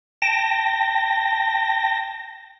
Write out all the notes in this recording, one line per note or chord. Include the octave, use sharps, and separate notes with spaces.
G5 A5 A#6